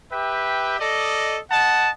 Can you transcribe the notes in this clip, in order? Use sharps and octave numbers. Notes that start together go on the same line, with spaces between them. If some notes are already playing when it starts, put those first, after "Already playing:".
G4 B4 E5 G5
A4 D5 D#5
D#5 F#5 A5